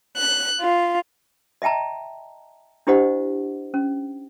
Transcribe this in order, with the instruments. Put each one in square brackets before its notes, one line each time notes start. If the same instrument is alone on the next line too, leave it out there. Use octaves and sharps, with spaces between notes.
[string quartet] F#6
F4
[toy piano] D#5 E5 G5 A5 A#5
D4 E4 G4 C5 D#5 F#5
C#4